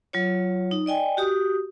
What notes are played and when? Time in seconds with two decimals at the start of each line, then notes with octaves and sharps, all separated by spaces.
0.13 F#3 F4 C#5
0.71 D#4
0.86 D5 D#5 G5 G#5
1.17 F#4 G4 D#6